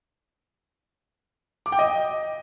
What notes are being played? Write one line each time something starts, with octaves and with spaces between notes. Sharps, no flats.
D6
G5
D#5